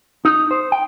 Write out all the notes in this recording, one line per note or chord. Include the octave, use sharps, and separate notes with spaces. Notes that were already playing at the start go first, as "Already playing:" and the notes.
D#4
C5
G5